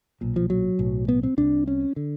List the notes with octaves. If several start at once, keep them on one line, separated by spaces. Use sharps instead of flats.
B1 A#2
F3
F#3
B1 A2
B3
C4
C2 C3 D4
C#4
D3